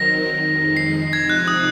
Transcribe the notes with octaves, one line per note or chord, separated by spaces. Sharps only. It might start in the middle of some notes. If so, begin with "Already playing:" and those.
Already playing: D#3 F#3 C4 D#4 A#4 A#6
F2 D#3 G#3 D#4
C7
C3 F3 C4 D#4 G#6
F#6
D#6